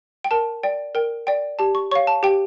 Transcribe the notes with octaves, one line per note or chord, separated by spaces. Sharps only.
G5
A#4 A5
D5 G5
A#4 G5
D5 G5
G4 A5
C#6
C#5 F5 C#6
A5
G4 G5